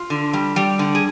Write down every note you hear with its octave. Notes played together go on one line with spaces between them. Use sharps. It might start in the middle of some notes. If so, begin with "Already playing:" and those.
Already playing: F4
D3
G3
G3
D3
G#4